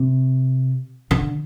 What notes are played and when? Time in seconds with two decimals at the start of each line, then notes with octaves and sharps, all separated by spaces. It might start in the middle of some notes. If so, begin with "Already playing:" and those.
Already playing: C3
1.11 D3